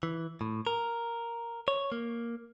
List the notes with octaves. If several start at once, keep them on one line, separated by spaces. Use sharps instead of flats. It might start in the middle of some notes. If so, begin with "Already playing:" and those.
E3
A2
A#4
C#5
A#3